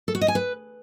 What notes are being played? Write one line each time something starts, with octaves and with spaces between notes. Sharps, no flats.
A4
F#4
D#5
G#5
B4